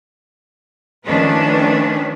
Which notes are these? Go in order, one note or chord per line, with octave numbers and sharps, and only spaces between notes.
D#3 F3 A3 C#4 D4 B4